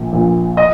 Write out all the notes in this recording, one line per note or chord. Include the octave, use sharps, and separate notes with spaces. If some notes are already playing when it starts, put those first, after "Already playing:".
Already playing: A#1 A#2
A#1 A#2
D#5